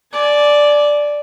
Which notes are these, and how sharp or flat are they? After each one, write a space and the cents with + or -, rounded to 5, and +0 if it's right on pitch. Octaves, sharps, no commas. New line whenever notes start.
D5 +0 G#5 +40